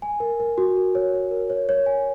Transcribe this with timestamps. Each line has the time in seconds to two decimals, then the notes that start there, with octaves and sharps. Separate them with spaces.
0.02 G#5
0.20 A#4
0.40 A#4
0.58 F#4
0.77 A#4
0.95 C#5
1.13 C#5
1.31 A#4
1.50 C#5
1.69 C#5
1.86 G#5